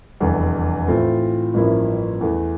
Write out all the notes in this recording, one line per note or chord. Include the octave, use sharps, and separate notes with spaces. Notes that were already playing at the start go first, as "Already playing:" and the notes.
F1 E2 D3 G3
A2 E3 A3 C4 F4
A1 G2 F3 A#3 E4
E2 E3 A3